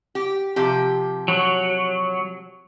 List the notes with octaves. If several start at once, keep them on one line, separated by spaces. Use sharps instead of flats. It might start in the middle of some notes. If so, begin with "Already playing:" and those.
G4
C3 F3 G4
F#3